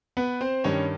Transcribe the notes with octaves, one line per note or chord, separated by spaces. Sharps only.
B3 B4
C4 C5
G2 D#3 G3 C#4 C#5